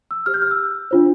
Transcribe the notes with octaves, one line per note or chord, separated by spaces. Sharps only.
E6
G4 C5 F6
G6
F6
E6
D4 F4 C5